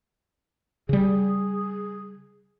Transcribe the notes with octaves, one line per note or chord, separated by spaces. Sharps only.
C#3 G3 G#4